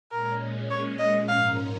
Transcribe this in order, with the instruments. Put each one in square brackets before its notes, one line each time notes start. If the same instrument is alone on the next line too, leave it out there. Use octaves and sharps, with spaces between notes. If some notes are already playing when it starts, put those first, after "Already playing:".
[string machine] A#2 G#3 C#4 [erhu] A#4
[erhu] C#5
D#5
[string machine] G#2 F3 C#4 A#4 [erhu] F5